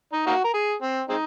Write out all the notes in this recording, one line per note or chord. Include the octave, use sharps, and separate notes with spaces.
D#4
A#3 D#4 F#4
A#4
G#4
C4
G#3 C4 D#4